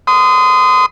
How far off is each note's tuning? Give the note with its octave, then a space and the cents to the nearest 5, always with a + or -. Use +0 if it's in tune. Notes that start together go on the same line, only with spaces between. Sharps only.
C6 -35 D#6 +0